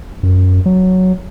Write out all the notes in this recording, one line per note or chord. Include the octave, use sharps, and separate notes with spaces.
F#2
F#3